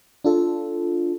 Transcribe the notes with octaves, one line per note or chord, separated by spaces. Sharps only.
D4 F4 A4